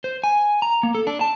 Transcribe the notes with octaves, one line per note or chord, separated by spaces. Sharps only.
C5
G#5
A#5
A#3
A4
D4
A5